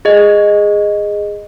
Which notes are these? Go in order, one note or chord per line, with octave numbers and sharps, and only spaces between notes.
G#4 D#5